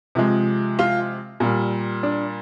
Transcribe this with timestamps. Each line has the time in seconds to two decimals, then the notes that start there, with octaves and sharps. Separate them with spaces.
0.15 C3 F3 G#3
0.79 F4
1.40 A#2 G3
2.03 D4